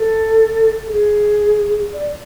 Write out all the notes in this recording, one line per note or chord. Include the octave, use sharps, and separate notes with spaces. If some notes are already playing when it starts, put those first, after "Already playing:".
Already playing: A4
G#4
D5